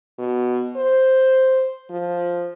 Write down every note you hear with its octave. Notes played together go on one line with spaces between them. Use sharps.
B2
C5
F3